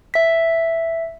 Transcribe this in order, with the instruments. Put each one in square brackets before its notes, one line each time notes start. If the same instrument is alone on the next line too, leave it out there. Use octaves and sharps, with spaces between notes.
[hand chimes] E5 B6